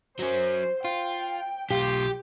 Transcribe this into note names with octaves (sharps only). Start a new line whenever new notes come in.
F#3 C#4 C5
F4 G5
B1 F4 G4 G5